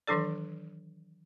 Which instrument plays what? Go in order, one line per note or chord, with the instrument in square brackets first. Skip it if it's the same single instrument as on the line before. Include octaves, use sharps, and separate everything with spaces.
[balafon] D#3 E3 F#3 D4 A4 D5